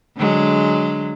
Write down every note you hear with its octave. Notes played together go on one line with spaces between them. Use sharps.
D3 F#3 G#3